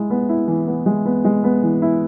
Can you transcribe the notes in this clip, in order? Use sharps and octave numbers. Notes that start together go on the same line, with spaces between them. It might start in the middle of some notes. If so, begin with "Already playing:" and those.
Already playing: G#3 E4
B3
E4
E3
B3
G#3
B3
G#3
B3
E3
E4